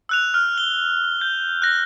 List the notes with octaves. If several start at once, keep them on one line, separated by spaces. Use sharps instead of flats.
E6 F#6 F7
F6
G7
G6
F#6 A#6